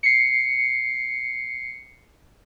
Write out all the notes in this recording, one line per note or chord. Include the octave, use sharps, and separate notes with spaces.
C7 C#7